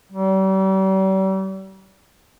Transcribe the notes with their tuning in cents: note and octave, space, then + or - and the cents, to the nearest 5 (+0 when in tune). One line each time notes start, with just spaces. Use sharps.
G3 -40